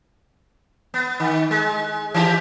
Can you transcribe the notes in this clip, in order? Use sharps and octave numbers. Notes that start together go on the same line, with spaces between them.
B3
D#3
G#3
E3 D4 G4